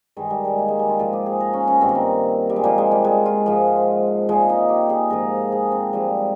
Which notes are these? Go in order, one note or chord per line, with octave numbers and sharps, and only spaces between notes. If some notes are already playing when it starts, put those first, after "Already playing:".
G2 D#3 G#3
G3
G#3
A#3
G#3
G3
F4
G#2 F3 F4
G4
G#4
A#4
C#4
C#4
G2 D#3 C4
A#3
C4
G3
G#3
A#2 F3 A#3
G#3
G3
G#3
F4
G#2 F3
A#2 F3 G#3
D#4
G4
G#4
G#2 F3 A#4
G#4
C4
G#2 F3 G3